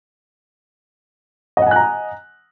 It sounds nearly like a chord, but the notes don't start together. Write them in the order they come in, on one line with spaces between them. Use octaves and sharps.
D#5 F#5 G#5 F#6 A#5